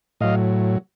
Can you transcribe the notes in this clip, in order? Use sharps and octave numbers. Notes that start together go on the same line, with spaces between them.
A2 F#3 D#5 F5